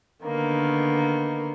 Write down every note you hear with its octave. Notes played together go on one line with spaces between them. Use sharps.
D3 D#3 A#3 B3